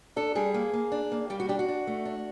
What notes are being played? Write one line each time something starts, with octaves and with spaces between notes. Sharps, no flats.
D4 A4
G3 G#4
A#3
A#3
D4
A#3
G3 G4
F#4
D4 G4
F#4
D4
A3
D4